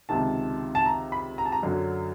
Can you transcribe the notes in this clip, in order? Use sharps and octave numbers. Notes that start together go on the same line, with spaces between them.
C#2 C3 D#3 A5
A5
A#5
B5
A#5
A5
A#5
F#2 D3 F#3